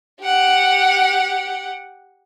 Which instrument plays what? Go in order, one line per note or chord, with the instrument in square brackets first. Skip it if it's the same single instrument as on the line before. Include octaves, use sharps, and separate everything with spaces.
[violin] G4 F#5